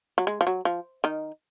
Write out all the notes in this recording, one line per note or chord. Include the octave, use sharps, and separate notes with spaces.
F#3
G#3
F3
F#3
F3
D#3 D#4